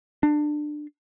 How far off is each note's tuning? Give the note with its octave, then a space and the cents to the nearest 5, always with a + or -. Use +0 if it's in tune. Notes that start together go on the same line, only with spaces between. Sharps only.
D4 +20